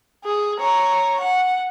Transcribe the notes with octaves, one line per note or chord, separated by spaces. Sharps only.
G#4
C#5 A#5
F#5